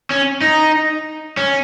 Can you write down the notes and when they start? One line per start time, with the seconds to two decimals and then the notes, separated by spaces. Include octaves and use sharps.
0.11 C#4
0.41 D#4
1.37 C#4